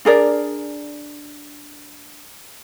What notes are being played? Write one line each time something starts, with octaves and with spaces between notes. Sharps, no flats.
D4 G#4 A#4 D5